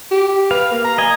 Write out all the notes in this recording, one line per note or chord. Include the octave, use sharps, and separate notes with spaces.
G4
B4 F5
A#3
A#5
D#5 G#5